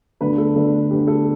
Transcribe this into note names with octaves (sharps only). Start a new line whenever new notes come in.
D2 D3 B3 D4 B4
A4
D2 D3 B3 D4
D2 D3 B3 D4 G4
A4